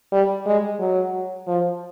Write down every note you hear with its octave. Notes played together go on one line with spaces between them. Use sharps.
G3
G#3
F#3
F3